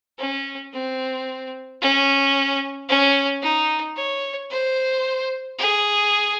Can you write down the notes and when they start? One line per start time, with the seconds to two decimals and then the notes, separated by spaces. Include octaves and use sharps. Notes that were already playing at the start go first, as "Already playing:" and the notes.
0.19 C#4
0.73 C4
1.81 C#4
2.89 C#4
3.42 D#4
3.96 C#5
4.50 C5
5.58 G#4